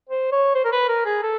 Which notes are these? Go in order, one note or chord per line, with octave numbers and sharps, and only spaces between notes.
C5
C#5
C5
A#4
B4
A#4
G#4
A4